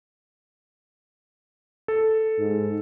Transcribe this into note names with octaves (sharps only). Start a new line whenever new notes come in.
A4
G#2